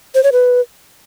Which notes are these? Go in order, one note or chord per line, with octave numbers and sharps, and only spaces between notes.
C5
C#5
B4